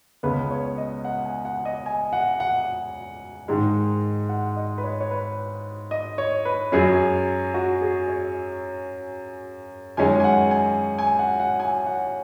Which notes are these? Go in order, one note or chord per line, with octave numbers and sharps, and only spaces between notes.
C#2 C#3 B3 B4
C#5
D#5
F#5
G#5
F#5
D#5
G#5
F#5
F#5
G#2 D#3 G#3
F#5
D#5
B4
C#5
C#5
B4
D#5
C#5
B4
F#2 F#3 C#4 G#4
F#4
G#4
C#5
F#2 D#3 G#3 C#4 G#5
G#5
F#5
G#5
G#5
F#5
F#5
G#5
F#5